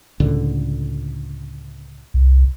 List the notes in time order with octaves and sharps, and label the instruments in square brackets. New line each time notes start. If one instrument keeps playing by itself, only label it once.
[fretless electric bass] C#2 A2 D3
[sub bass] C2